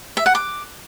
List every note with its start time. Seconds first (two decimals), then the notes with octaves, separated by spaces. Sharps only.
0.17 E5
0.26 F#5
0.35 D6